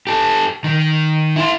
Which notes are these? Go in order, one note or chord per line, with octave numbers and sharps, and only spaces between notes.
G4 A4
D#3
E4 C6